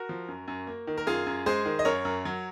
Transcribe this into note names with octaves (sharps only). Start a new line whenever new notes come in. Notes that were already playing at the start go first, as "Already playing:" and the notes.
Already playing: F#4 A#4
F3
F#2
F#2
A#3
D#3
A#4
F#2 F4 G#4
F#2
G#3 G#4 C5
D#3
D#5
F#2 A#4 C#5
F#2
F#3